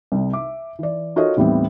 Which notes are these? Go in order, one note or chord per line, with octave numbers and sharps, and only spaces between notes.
C2 C3
E5 D6
E3 D5
F4 F#4 A4 A#4 C#5 D#5
D#2 A2 E3 G3 B3 C4